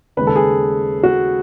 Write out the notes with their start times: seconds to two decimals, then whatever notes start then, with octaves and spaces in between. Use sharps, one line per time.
0.17 D#2 C#3 G#3 B4
0.27 A4
0.36 G#4
1.03 F#4